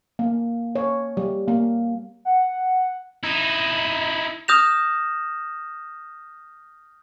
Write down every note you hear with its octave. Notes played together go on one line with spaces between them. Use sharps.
A#3
C#5
G3
A#3
F#5
D#4 E4
D#6 F6 G6 A#6 E7 F7